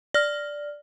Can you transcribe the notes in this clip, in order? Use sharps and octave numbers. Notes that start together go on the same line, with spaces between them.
D5 F6